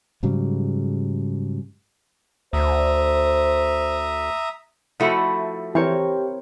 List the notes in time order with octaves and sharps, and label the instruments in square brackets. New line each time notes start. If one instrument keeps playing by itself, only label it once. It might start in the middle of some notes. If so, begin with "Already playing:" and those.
[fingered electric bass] G#2 C#3 F#3 G3
[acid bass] D2 [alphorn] C5 [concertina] E5 A#5 D#6
[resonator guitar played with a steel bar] F3 A3 F#4 [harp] E4 E5 B5
[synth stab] E3 [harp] C4 A#4 C#5 [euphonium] G4